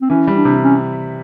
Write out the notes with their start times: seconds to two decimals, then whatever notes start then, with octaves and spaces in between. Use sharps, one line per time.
0.01 C4
0.10 E3 C#4
0.27 G3
0.37 D4
0.45 C3
0.63 C#4